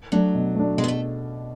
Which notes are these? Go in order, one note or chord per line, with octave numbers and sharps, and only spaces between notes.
F#3 A3 D4
B2
A3 D4
B2 G#3
B3
A3